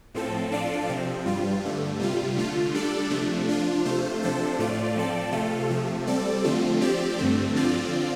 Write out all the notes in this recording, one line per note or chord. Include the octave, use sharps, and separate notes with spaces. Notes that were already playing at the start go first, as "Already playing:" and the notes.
A2 F3 C4 A4
F3 D4 F4 A4 D5
C3 F3 C4
G2 G3 F4
G2 D3 A3
C3 G3 F4
D3 A3 F4
G3 D4 A4 D5
C3 F3 A3 D4
F3 D4 F4
C3 A3 F4 C5
C3 F3 D4 A4 C5
A2 A3 F4 D5
F3 C4 A4 D5
C3 A3 F4 A4
C3 F3 A3
G3 C4 A4 D5
D3 F3 A3 C4 F4
F3 C4 G4 D5
G2 D3 A3 C4
D3 F3 C4 F4 D5